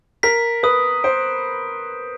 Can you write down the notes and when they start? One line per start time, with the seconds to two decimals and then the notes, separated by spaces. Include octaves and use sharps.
0.23 A#4 B6
0.63 B4 D#6
1.04 C5 D7